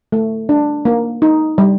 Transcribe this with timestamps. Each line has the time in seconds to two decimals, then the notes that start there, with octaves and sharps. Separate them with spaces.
0.12 A3
0.49 D4
0.85 A#3
1.22 D#4
1.58 G3